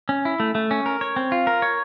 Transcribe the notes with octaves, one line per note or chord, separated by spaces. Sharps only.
C#4
E4
A3
A3
C#4
A#4
C#5
C4
F4
A#4
C#5